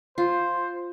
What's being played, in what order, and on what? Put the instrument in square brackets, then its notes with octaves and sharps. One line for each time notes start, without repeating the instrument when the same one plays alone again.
[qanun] F4 [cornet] C5